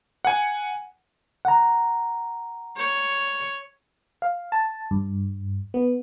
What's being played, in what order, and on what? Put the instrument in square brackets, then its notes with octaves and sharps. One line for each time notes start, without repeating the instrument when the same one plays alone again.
[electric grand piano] F#5 G#5
[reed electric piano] F#5 A#5
[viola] C#5
[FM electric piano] F5
A5
G2
B3